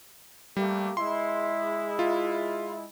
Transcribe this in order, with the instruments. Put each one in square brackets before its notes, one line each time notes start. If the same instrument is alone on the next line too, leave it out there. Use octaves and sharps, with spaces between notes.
[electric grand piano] G3 [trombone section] A3 A#3 G4
[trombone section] G#3 E4 [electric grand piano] C6
[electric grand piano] F4